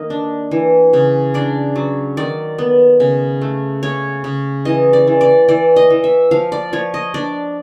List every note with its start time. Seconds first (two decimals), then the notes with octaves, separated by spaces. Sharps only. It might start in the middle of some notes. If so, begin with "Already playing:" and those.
Already playing: D#3 A#3 D#5
0.10 D4
0.51 E3
0.93 C#3
1.34 D4 D5
1.76 F#3
2.17 D#3 D5
2.58 B3
3.00 C#3
3.41 A3
3.83 C#3 C#5
4.24 C#3
4.65 E3 D#5
4.93 D5
5.07 E3
5.21 D5
5.48 E3 D5
5.76 D#5
5.90 E3
6.04 E5
6.31 F3 F5
6.52 D5
6.73 F3 C#5
6.94 D#5
7.14 D4 D5